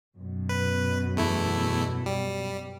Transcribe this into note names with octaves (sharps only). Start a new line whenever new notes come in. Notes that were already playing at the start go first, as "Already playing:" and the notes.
F#2 B2
B4
E2 A3 E4
G3